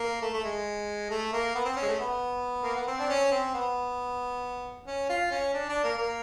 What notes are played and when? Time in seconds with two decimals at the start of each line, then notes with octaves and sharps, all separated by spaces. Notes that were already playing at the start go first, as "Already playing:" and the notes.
Already playing: A#3
0.22 A3
0.34 A3
0.44 G#3
1.10 A3
1.33 A#3
1.55 B3
1.65 C4
1.76 C#4
1.82 G#3
1.87 A3
1.99 B3
2.63 A#3
2.76 B3
2.87 C4
2.99 D4
3.10 C#4
3.31 C4
3.54 B3
4.87 C#4
5.09 F4
5.31 C#4
5.54 D4
5.69 D4
5.83 A#3
5.98 A#3